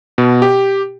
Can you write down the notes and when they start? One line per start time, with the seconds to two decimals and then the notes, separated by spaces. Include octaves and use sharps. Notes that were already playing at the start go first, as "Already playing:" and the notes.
0.18 B2
0.42 G4